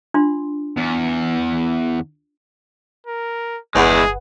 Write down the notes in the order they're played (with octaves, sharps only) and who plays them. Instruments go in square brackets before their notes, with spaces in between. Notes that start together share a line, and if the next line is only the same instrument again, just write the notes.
[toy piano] D4 F4 C6
[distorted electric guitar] E2
[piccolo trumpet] A#4
[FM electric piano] G1 B4 F#5 [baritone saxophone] E2 [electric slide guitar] G#3 E4 [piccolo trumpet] G#4